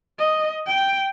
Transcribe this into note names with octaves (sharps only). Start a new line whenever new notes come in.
D#5
G5